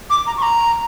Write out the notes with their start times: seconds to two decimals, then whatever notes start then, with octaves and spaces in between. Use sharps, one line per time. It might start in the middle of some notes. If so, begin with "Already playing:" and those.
0.10 D6
0.27 A#5
0.37 C#6
0.42 A#5